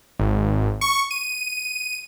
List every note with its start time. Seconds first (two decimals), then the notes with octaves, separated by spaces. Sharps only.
0.20 G#1
0.81 C#6
1.11 D#7